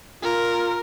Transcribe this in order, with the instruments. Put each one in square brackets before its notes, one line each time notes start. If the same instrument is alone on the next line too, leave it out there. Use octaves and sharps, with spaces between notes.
[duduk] F4 [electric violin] A#4